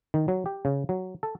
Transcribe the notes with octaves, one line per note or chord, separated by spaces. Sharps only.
D#3
F#3
G4
C#3
F#3
A4